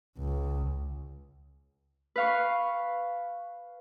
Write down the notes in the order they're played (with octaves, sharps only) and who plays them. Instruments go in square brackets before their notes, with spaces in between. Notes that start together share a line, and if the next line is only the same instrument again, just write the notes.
[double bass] C#2
[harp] B4 F5 C#6